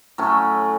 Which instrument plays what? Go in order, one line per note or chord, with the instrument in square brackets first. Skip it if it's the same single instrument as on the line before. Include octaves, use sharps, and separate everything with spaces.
[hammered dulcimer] A2 F#3 A3 C#4